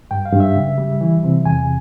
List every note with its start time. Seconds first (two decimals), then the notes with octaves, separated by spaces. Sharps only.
0.11 G2 G5
0.25 F5
0.33 G2
0.40 E5
0.56 C#3
0.78 G3
1.01 E3
1.23 C3
1.45 E2 G#5